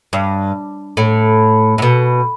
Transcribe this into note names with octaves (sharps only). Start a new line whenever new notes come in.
G2
A2
A2
B2